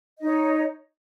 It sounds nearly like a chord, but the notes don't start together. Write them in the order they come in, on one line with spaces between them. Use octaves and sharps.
D#5 D#4 C#5